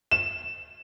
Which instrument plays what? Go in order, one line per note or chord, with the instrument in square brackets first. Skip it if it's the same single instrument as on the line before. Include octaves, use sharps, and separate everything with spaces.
[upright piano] E7